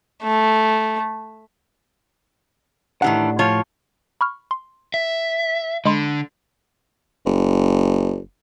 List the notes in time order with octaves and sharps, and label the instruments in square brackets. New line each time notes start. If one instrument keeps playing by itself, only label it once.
[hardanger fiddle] A3
[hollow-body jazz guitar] A2 G4 F#5 [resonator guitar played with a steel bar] D#3 E3 D4
[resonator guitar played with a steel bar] F3 F4 C#5
[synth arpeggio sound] B5 C#6 F6
C6
[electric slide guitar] E5
[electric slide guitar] D3 [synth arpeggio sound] G#3 B5 C6
[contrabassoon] F#1